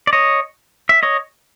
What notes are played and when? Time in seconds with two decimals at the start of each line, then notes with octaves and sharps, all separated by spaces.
0.07 D5
0.13 C#5 D#5
0.89 E5
1.03 C#5 D#5